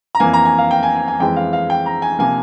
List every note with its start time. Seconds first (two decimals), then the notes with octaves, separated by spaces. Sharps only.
0.15 A#5
0.20 F2 E3 A#3 G#5
0.33 A#5
0.45 G#5
0.58 F5
0.71 G5
0.83 G#5
0.96 G#5
1.08 G#5
1.19 F2 E3 G#3 G5
1.36 F5
1.53 F5
1.70 G5
1.86 A#5
2.02 G#5
2.19 C3 F3 A#3 G#5